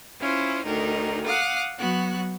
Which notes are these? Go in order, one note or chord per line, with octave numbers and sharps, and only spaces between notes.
C#4 E4 F4 C5
D2 D#3 D#4 A#4
F5 F#5 D6 D#6
F#3 B3 F#4 F#6